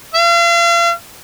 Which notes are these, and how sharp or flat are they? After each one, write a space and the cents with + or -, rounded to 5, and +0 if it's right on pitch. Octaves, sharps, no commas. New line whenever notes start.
F5 -40